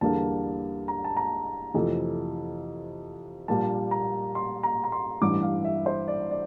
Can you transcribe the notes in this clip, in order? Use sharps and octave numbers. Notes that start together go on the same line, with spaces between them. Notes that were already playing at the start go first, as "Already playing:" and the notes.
E2 D3 G3 A#3 A5
A#5
A5
A#5
F2 C3 E3 A3
A#1 A#2 G3 A#3 A5
A#5
C6
A#5
A#5
C6
A1 G2 E3 D6
F5
E5
C5
D5
D5